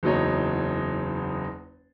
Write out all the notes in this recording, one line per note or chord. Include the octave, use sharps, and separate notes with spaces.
F#1 E2 F#3 D#4 C#5